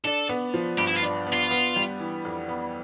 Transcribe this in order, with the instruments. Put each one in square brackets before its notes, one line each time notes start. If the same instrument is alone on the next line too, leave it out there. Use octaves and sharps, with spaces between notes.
[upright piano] D4 [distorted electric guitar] A4
[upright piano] B3
F3
[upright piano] G2 [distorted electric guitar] G4
[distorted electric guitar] E4
F4
[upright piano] D4
B3
[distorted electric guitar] F4
[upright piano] B3
G3
E3
F2
B3